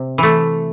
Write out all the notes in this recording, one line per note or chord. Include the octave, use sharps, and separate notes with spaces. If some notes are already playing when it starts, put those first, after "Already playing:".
Already playing: C3
E3 A3